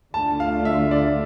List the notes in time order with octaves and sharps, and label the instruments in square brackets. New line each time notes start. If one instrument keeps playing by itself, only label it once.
[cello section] D2 D3 A3 D4 F4 [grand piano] A5
[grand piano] F5
E5
D5